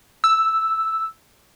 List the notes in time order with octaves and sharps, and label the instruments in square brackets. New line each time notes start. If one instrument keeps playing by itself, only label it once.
[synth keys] E6